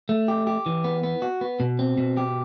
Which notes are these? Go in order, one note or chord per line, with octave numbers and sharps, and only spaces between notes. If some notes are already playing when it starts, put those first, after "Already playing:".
A3
G4
G4
E3
B3
B3
F#4
B3
B2
C4
B2
G4